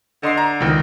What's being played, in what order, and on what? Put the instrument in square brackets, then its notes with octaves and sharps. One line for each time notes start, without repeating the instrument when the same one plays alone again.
[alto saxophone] D3 [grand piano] D#5 C6 C7
[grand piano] A#5
C#2 D#3